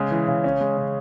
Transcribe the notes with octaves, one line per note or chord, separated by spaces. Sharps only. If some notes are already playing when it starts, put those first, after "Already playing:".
Already playing: C#3 G#3
E3
C#3
C#4
G#3
C#3